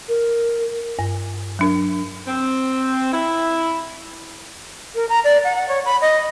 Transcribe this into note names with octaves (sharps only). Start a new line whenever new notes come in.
A#4
G2
F#3 D4 A#4
C4
E4
A#4
A#5
D5
F#5
F#5
C#5
B5
D#5